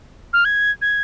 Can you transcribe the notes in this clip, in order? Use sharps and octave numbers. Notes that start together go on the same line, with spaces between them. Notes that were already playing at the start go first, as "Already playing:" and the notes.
F6
G#6
G#6